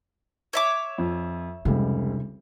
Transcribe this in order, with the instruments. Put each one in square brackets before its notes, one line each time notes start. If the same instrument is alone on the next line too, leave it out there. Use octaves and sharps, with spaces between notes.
[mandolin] C#5 E5 D6
[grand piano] F2
[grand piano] F1 C#2 [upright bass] C3 G3